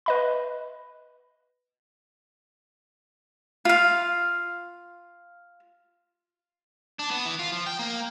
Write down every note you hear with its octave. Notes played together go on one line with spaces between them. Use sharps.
B4 D#5 B5
F4 F5
D4
B3
E3
F4
F3
G5
A#3